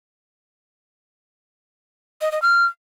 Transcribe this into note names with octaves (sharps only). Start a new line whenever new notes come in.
D#5
D#5
F6